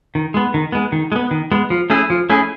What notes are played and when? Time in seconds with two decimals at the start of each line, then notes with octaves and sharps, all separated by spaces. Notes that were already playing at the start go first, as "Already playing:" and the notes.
0.15 D#3
0.34 G#3 B3
0.54 D#3
0.72 G#3 B3
0.92 D#3
1.12 G#3
1.16 B3
1.31 D#3
1.52 G#3 B3
1.70 F3
1.90 A3 C#4 E4 G#4
2.10 F3
2.30 A3 C#4 E4 G#4